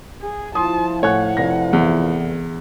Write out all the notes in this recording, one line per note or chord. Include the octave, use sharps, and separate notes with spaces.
G#4
F3 E4 A5 C6 D#6
A2 C#5 F#5 G#5 F#6
F1 A#6
E2